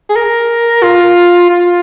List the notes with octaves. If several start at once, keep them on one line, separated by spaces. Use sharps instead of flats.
G#4
A#4
F4
F4